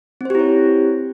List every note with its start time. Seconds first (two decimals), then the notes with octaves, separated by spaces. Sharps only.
0.21 C4
0.25 C5
0.30 G4
0.35 E4
0.40 C#5